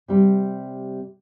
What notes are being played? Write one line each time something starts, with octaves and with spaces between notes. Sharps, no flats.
C3 G3